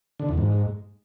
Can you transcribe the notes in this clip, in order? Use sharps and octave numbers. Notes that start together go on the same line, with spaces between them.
D3
E2
G#2